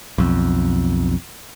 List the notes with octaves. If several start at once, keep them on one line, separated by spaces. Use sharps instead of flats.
B1 F2